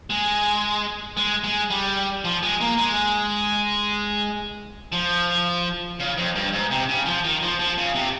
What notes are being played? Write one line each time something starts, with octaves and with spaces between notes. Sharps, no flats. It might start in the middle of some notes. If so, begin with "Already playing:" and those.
G#3
G#3
G#3
G3
F3
G#3
A#3
G#3
F3
C#3
F2
G2
G#2
C3
C#3
F3
D#3
F3
F3
C#3
C3